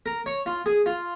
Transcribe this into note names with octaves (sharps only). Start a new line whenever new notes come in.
A#4
C#5
F4
G#4
F4